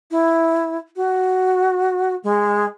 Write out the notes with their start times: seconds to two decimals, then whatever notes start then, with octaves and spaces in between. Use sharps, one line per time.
0.11 E4
0.96 F#4
2.24 G#3